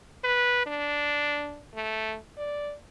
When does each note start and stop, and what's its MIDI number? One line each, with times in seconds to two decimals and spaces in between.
0.24 0.66 71
0.66 1.63 62
1.75 2.16 57
2.37 2.74 74